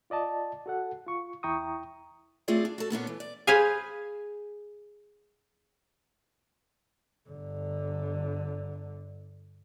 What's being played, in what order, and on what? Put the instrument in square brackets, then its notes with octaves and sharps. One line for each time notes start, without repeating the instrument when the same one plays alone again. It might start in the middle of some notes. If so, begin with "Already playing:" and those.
[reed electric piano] F4 D5 D#5 A5
F#4 A4 F#5
F4 C#6
E2 E4 G5 A#5 C#6 D#6
[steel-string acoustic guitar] A3 C4 F4 G#4 D5 G5
D4
F#4 A4
A#2 B3 C#4 D4
E3
D5
[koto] G#4 B4 C5 F5 G#5
[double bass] G1 D3